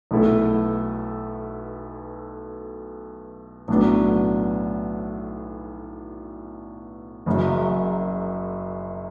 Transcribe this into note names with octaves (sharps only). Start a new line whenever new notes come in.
B1 B2 A3 E4 A4
B1 A2 F#3 B3 D4
F#1 F#2 C#3 F#3